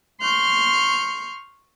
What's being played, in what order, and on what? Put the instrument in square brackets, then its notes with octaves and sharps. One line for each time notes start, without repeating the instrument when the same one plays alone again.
[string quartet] C6 C#6 F6 G6